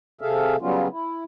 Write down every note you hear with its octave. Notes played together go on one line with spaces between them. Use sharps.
C3 G#4 A4 E5 F5
C#3 F#3 G3 B3 C#4 F4
E4